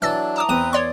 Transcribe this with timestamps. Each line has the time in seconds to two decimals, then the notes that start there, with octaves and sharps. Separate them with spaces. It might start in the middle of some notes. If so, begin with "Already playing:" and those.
0.02 E3 F#3 D4 E6 A6
0.36 A5 A#5 D6 D#6
0.49 E2 C4 B4 D#6 D#7
0.73 C#5 D5 C6